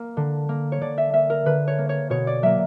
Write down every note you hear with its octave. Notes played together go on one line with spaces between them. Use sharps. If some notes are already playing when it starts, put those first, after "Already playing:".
Already playing: A#3
D3
A#3
C#5
D3 D5
E5
A#3 E5
A#4
D3 B4
C#5
A#3
C#5
B2 C#5
D5
F#3 A#3 E5